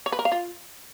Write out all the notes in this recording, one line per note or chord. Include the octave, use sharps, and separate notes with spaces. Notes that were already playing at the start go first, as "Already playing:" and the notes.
C#5
B4
A#4
F5
F4